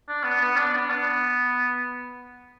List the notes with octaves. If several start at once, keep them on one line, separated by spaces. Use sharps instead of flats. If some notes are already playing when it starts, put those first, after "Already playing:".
D4
B3
B3
D4
D4
B3